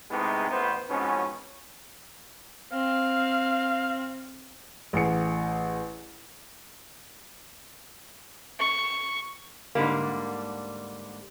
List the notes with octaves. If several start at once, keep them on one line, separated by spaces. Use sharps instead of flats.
A2 C3 G#3 B3 D#4 G#4
A1 B3 C5
F2 G#2 B2 B3 C#4
C4 F5
A1 G#4 C#7
C#6
G#2 D3 G3 A#3